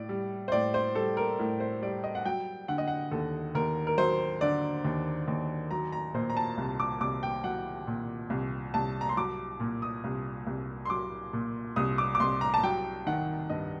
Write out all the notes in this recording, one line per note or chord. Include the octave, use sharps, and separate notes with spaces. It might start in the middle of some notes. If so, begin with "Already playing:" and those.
Already playing: A2 D5
G3
C5
A2 D5
C5
G3 A4
A#4
A2 A#4
C5
G3 D5
D#5
F#5
F#3 G5
D3 F#5
D#5
F#5
D#2 A4
D#2 A#4
A#4
F#3 C5
D3 D5
D#2
D#2
F#3 A#5
A#5
A#2 C5
A#5
A5
C2
D6
C2 D6
G5
F#3 F#5
A#2
C2
C2 A5
A#5
C6
F#3 D6
A#2
D#6
C2
C2
C6
F#3 D6
A#2
C2 D#6
D6
D6
C2 C6
A#5
A5
F#3 G5
D#3 F#5
G2 D#5